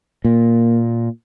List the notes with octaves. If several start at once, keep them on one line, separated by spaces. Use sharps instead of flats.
A#2 A#3